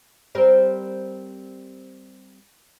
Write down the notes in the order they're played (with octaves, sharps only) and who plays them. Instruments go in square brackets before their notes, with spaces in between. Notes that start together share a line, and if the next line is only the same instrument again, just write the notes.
[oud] G3 C4 A#4